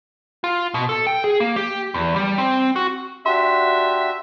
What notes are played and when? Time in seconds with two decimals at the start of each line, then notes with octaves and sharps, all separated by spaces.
0.44 F4
0.74 B2
0.89 A4
1.07 G5
1.24 G#4
1.40 A#3
1.56 G4
1.94 E2
2.16 G3
2.38 C4
2.76 F#4
3.26 D4 F#4 G4 E5 C6